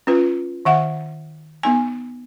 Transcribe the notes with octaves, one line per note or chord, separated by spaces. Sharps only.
C#4 F4 B4
D#3 E5 F#5
B3 D#4 G#5